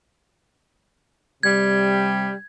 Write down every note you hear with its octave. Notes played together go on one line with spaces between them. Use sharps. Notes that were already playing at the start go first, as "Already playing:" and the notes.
C3 G3 G#6